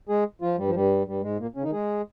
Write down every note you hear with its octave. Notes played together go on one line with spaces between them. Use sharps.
G#3 G#4
F3 F4
G2 G3
F3
G2 G3
G2 G3
G#2 G#3
A#2 A#3
C#3 C#4
D#3 D#4
G#3 G#4